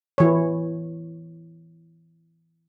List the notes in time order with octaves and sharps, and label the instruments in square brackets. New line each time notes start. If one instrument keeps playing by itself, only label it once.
[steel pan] E3 C#5